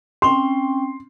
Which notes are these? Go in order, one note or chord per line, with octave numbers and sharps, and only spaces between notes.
C4 C#4 G5 C6